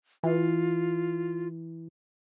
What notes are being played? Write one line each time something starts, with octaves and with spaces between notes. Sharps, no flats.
E3 F4